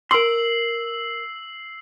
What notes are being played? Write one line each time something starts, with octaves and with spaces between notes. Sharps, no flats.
A#4 C6 E6 C7 F#7